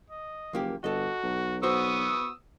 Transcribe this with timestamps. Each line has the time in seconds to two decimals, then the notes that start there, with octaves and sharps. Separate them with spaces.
0.10 D#5
0.53 F#1 F3 A#3 G4
0.84 G1 F#4 A4 D#5
1.23 B1
1.63 B3 F#4 C5 C#6 D#6 E6